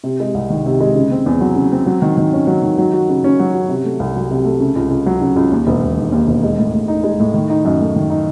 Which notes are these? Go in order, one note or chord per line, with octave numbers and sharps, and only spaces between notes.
C3
G#3
C2
D#3
C3
G#3
C#3
C4
E2
F#3
C#3
C4
F#3
D#3
D#3
C#4
F#3
D#3
F#3
F#4
C#3
C#4
F#3
F#4
C3
A3
C2
F#3
C3
A3
C#3
C#2
C#2
F#3
C#3
C#2
D#2
E1
E1
D#3
D#2
E1
G#3
A2
A2
D#4
G#3
A2
D#3
D#4
F#2
A3
D#3
D#4